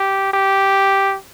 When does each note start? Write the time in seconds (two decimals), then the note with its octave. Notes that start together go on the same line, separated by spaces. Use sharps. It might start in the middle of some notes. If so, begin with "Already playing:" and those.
Already playing: G4
0.33 G4